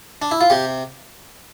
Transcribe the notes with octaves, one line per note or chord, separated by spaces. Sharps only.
D4
E4
F4
C3 G4